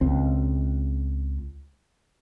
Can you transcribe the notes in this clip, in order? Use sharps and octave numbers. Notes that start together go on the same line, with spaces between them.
C#2 C4